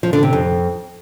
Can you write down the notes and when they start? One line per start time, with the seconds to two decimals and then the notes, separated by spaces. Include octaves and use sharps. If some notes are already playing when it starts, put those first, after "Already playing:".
0.03 F3
0.13 D3
0.23 C3
0.33 F2